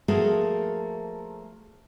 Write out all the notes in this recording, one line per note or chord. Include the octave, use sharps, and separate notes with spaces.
F3 A3 A#3 F#4 G#4 A#4